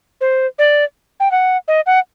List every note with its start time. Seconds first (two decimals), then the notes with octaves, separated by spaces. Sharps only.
0.21 C5
0.58 D5
1.20 G5
1.31 F#5
1.68 D#5
1.86 F#5